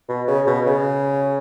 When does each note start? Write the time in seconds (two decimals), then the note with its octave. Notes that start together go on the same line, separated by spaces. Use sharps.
0.09 B2
0.28 C#3
0.47 B2
0.66 C#3